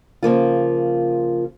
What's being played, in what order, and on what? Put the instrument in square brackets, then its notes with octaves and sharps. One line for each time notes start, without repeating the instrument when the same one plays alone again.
[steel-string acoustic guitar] C#3 F3 A#3 F4